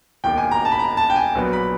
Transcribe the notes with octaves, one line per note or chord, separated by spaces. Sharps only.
E1 D#2 D#3 G5
G#5
A#5
A5
B5
A#5
A5
G5
G#5
A#1 A#2 F#3 B3
B5